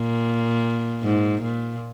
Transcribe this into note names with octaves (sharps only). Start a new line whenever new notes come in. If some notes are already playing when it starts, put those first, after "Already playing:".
Already playing: A#2
G#2
A#2